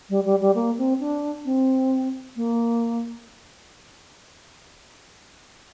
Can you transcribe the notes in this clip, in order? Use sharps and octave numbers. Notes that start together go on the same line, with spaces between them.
G3
G3
G3
A#3
C4
D4
C4
A#3